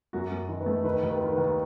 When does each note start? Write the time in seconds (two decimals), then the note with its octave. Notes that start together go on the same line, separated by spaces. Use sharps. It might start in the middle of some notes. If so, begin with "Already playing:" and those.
0.13 F#2 F#4
0.32 F#2
0.49 D#3
0.60 B4
0.66 A3
0.84 D#3 B4
1.03 D#2
1.09 B4
1.21 D#3
1.32 B4
1.38 D#2